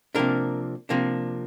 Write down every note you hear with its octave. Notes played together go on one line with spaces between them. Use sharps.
C3 F3 A#3 D4 A#4
C3 F3 A#3 D4